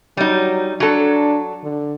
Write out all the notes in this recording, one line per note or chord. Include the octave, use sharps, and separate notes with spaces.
F#3 G3 D#4
F#3 D4 A4
D3